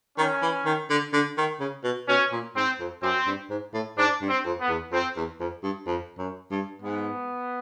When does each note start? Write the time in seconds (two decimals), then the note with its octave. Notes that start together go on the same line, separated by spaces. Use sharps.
0.18 D#3 C#4
0.42 E3
0.66 D#3
0.90 D3
1.13 D3
1.37 D#3
1.60 C#3
1.84 B2
2.08 B2 C#4
2.32 A#2
2.56 G#2 C4
2.80 F2
3.03 F#2 C4
3.27 G2
3.50 G#2
3.74 A2
3.98 G#2 D4
4.22 G2
4.29 C4
4.45 F2
4.61 B3
4.69 E2
4.92 F2 C4
5.16 E2
5.40 F2
5.63 G2
5.87 F2
6.18 F#2
6.51 G2
6.82 G#2 B3